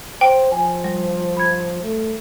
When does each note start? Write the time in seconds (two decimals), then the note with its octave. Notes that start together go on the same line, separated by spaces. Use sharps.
0.21 C5 G5
0.52 F3 G#5
0.84 G3
1.37 B5 G#6
1.83 A3